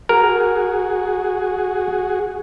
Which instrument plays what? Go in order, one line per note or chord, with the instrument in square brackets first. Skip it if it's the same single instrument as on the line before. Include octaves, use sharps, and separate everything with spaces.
[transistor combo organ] F#4 G#4 [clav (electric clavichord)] A#4